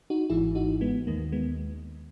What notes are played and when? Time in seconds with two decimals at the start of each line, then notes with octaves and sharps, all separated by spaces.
0.10 D#4 F#4
0.30 G#1 G#2 E3 E4 G#4
0.55 D#4 F#4
0.81 G#3 B3
1.07 D#2 D#3 A#3
1.32 G#3 B3